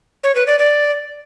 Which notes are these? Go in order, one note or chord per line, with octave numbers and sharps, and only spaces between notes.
C#5
B4
D5
D5